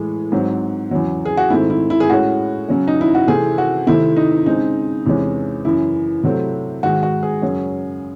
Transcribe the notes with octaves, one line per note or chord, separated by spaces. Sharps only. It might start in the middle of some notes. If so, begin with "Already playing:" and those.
Already playing: A2 E3 G#3
G#2 F#3 C4
E2 C#3 F#3
G#4
F#4
G#2 D#3 A3 C4 E4
E4
E4
G#4
A2 G#3 C#4 F#4
C#3 F#3 C#4
D#4
E4
F#4
C3 E3 A3 C4 G#4
F#4
C3 D#3 A3 C4 E4
D#4
C#3 G#3 C4 D#4
E2 C3 E3 G#3 C#4
F#2 C#3 E3 E4
C3 F#3 A3 C4
G#2 D#3 G#3 F#4
F#4
G#4
F#2 C#3 F#3 C#4